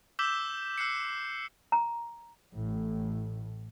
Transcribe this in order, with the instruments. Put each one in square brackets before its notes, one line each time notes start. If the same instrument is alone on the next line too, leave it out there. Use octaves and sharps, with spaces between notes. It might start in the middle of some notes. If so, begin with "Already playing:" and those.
[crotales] D6 E6 G6 B6 E7 G7
E6 F#6 C7 C#7
[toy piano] A#5
[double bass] A1 A2